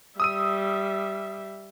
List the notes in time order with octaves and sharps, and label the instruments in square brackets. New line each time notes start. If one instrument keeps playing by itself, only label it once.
[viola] G3 E5 [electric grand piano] D#6 E6 D#7